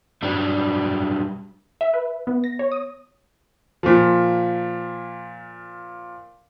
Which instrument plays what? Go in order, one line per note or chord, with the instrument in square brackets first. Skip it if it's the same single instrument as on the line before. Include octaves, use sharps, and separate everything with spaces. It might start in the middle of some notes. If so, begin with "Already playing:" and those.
[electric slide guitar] F#3 G3 D4
[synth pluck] E5
B4
B3
A#6
C#5
D#6
[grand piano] A#2 F3